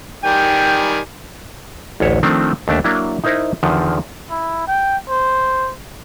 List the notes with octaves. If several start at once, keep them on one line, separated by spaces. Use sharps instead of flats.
D#3 G3 G5 G#5
A1 D2 C#5 E5
D#3 F3 A3 C4 D4
D#2 A3 D4 E5
F#3 A#3 D4 E4
D#4 E4 A#4 C5 E5
E2 D3 D#3 F3
E4
G5
C5